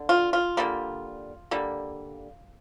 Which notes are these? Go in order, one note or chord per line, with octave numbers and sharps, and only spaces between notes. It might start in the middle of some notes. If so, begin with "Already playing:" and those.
Already playing: D3
F4
F4
D3 G3 A#3
D3 G3 A#3